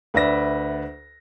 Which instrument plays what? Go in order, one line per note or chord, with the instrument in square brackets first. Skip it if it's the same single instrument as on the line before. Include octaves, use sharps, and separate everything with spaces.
[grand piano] D2 B4 D5 E5 B5 A#6